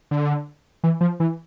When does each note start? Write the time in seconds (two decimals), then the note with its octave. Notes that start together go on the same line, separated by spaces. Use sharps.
0.11 D3
0.84 E3
1.01 F3
1.20 E3